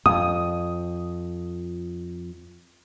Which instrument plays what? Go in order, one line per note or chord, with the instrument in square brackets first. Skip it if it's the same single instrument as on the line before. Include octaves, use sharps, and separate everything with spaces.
[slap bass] F2 [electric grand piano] D#6